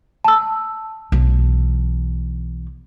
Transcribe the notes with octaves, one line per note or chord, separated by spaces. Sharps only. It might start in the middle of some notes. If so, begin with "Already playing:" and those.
A5 E6
B1 E3